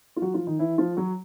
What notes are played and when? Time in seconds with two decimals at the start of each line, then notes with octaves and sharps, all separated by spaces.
0.16 F4
0.22 F#3 F#4
0.34 F3 F4
0.47 D#3 D#4
0.59 E3 E4
0.78 F3 F4
0.97 F#3 F#4